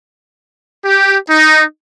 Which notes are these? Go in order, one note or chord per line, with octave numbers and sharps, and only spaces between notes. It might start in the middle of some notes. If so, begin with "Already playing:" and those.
G4
D#4